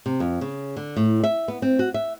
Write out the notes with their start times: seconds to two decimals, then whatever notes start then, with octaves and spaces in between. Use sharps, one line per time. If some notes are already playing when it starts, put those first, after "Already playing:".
0.06 C3
0.20 F2
0.41 C#3
0.77 D3
0.96 A2
1.24 E5
1.48 B3
1.62 C4
1.79 F#4
1.94 E5